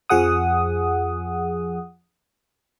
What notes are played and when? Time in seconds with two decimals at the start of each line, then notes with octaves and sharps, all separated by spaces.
0.10 F2 F3 G#4 F#5 D#6